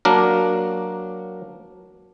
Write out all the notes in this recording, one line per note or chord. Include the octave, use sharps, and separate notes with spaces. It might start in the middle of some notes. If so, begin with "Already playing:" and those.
F#3 A#3 D4 A#4